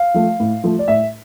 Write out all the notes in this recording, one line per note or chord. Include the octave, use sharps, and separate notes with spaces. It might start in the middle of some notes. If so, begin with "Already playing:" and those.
Already playing: F5
F3 A3
A2
F3 A3
D5
A2 E5